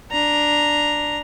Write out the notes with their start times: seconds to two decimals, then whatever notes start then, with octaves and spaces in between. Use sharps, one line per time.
0.11 D4 A#5